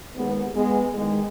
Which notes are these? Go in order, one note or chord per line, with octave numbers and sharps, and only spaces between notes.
D#2 D#3 G#3 B3
G#3 B3
E2 D#3 G#3